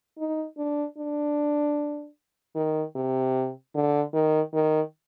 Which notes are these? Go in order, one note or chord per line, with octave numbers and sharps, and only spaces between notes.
D#4
D4
D4
D#3
C3
D3
D#3
D#3